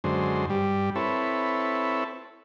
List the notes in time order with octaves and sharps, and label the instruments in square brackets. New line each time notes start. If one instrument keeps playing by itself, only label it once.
[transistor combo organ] F#2 D3 G#3 C5
G2 G3
C4 E4 A4 B4 C#5